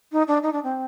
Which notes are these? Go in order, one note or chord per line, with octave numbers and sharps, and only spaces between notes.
D#4
D4
D#4
D4
C4